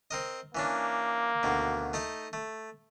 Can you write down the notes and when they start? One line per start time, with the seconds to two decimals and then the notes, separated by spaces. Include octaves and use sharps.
0.11 C4 A#4 D#5
0.55 E3 A#3 C#4 D4
1.43 D2 B2 D#3
1.93 A3 D#4 D#5
2.33 A3